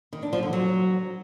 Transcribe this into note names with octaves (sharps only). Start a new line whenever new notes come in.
D#3
D4
F3
D3
F#3